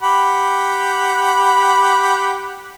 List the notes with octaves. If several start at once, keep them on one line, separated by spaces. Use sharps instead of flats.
G4 F#5 B5